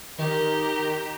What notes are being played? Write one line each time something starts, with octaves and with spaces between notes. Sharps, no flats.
D#3 G4 A#5